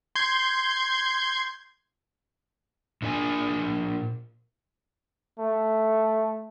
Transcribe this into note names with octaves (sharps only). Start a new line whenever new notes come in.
C6 G6 G#6
A#2 D4 A#4 G#5
A3